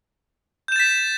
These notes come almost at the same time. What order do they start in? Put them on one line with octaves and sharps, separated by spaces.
G6 E7 A6 B6